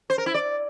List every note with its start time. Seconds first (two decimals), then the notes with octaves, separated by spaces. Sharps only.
0.10 C5
0.18 A#4
0.26 E4
0.34 D5